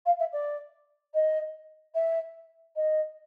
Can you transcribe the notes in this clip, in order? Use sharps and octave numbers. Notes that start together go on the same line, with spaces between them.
F5
E5
D5
D#5
E5
D#5